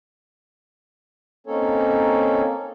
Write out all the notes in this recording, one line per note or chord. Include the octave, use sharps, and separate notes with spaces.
A#3 C4 C#4 D#4 A4 C#5